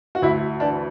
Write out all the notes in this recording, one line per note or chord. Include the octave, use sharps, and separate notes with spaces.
F#4
D2 E4
E3 D4